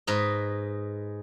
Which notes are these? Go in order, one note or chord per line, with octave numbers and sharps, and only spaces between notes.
G#2 B4 D#5